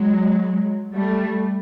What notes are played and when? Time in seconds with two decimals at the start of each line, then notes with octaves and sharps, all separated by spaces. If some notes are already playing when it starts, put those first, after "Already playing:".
Already playing: F#3 G#3
0.92 G3 A3